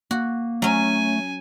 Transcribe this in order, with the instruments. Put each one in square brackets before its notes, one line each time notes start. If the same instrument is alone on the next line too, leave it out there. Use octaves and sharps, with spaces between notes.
[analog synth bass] A#3 [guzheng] F#4
[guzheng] F#3 C#4 [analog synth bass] A3 [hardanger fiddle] G#5